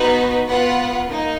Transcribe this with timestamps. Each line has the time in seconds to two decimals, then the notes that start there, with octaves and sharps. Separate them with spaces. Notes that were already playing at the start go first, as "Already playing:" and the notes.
Already playing: B3 D#4 F#4 B4
0.47 B3 F4 B4 F#5
1.07 A#3 D#4